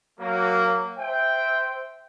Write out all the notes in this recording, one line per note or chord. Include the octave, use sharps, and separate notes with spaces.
F#3 A#3
C5 E5 G5